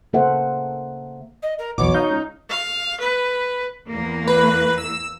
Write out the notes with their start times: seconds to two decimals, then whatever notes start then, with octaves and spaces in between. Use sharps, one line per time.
0.13 C#3 A#3 A4 C5 E5 F#5
1.42 D#5
1.59 A#4
1.78 B1 E2 B2 C#5 D6
1.94 D#4 F5 G6
2.11 C#2
2.50 F5
3.01 B4
3.90 E2 A#3
4.27 B4
4.78 E6